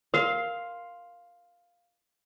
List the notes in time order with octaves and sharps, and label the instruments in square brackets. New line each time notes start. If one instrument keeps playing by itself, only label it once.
[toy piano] A#4 [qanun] F5 C6